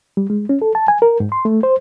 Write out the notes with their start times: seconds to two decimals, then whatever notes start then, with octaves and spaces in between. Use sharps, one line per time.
0.17 G3
0.30 G#3
0.49 C#4
0.62 A4
0.75 A5
0.88 G#5
1.02 A#4
1.20 G#2
1.32 C6
1.45 A3
1.63 C5